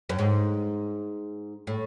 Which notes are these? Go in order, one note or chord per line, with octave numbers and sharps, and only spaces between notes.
F#2
G#2
A2